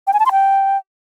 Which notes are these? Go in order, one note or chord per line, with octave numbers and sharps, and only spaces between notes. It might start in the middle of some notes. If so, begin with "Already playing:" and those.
G5
G#5
A5
C6
G5